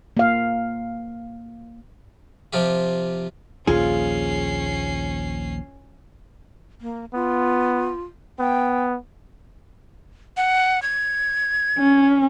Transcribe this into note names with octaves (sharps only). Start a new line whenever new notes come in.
A#3 F5
C3 F3 F4 G4
A#1 D#2 F3 C#4 F4 G#4 C7
A#3
B3 F4
B3 G5
F#5
G#6
C#4